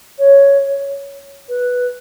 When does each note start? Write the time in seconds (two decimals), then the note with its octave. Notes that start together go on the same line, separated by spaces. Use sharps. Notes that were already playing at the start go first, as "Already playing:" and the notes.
0.19 C#5
1.49 B4